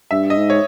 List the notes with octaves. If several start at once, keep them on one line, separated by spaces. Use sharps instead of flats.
G2 E5
D#5
G#2
C#5